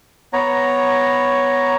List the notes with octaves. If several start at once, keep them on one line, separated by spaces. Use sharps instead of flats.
B3 C#5 A#5